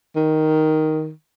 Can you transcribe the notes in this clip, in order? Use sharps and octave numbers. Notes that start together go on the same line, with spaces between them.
D#3